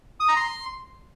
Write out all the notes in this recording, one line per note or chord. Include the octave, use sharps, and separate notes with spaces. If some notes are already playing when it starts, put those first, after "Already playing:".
D#6
A#5
C6